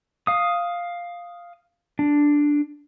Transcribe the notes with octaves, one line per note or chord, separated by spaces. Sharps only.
F5 D#6
D4